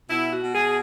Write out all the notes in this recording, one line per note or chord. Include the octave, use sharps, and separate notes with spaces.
B2 E4
F#4
B2
G#4